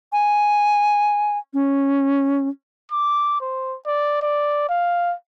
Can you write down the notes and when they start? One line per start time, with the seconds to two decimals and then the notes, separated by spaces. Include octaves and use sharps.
0.13 G#5
1.54 C#4
2.92 D6
3.41 C5
3.87 D5
4.23 D5
4.69 F5